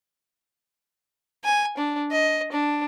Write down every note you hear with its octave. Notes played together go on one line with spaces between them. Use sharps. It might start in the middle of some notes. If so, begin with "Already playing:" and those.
G#5
D4
D#5
D4